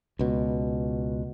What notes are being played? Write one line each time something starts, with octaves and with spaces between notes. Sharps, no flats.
C#2 B2